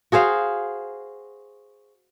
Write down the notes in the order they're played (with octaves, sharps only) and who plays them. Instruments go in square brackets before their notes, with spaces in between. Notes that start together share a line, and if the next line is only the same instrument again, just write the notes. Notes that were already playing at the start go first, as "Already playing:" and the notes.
[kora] F#4 G#4 C5 F5